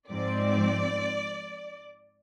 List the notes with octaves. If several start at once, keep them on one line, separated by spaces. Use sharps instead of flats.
G#2 F3 C4 D5